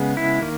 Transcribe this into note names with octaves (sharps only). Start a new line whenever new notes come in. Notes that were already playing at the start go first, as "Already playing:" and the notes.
Already playing: C#3 G#3 B3
E4
D#3 A#3